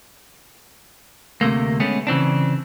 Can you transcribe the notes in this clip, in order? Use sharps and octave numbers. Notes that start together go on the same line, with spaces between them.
D2 C3 A3 A#3
G#3 A3 B3 C#4
C#3 E3 C4 D4